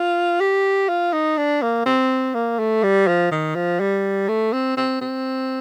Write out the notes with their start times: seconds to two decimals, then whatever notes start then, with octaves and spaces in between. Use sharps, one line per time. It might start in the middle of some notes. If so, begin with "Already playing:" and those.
Already playing: F4
0.40 G4
0.89 F4
1.13 D#4
1.37 D4
1.62 A#3
1.86 C4
2.34 A#3
2.59 A3
2.83 G3
3.08 F3
3.31 D#3
3.55 F3
3.80 G3
4.28 A3
4.53 C4
4.77 C4
5.01 C4